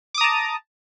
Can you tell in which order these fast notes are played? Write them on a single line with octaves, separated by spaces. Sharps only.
D6 D#6 A#5 A5